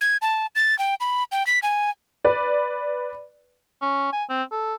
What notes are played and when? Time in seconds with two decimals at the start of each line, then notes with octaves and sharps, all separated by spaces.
0.01 G#6
0.22 A5
0.55 A6
0.79 G5
1.00 B5
1.32 G5
1.46 B6
1.62 G#5
2.24 B4 D5
3.82 C#4
4.13 G#5
4.29 C4
4.52 A4